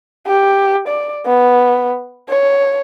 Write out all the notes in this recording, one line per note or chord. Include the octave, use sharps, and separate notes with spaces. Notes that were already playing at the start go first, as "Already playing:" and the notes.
G4
D5
B3
C#5